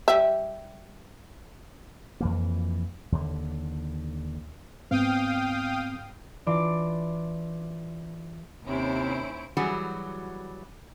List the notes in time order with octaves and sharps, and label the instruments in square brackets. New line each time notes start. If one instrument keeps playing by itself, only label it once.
[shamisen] G3 E5
[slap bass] F2 E3 A#3
D#2 D3
[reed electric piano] G#2 B3 C4 [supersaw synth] F5 G5 D#6
[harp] E3 D4 F4 D5 D6
[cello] D#2 C5 [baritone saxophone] C3 [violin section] C#4 E4 D7
[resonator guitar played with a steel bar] E3 F#3 G3 F#4 G#4